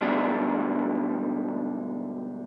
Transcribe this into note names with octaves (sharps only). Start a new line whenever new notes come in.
G#2 B2 D3 G3 A3 D4